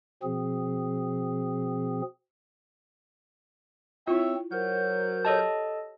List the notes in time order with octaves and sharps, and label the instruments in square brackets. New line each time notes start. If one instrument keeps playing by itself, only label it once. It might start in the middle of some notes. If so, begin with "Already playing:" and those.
[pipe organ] B2 F3 C4 G#4
[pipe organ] C4 [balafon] E4 F4 [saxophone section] C#5 E5
[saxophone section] F#3 [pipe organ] A#4 C5 G6
[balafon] G4 C#5 [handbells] A4 D#5 A5